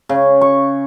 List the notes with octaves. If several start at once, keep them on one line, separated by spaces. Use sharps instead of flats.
C#3
C#6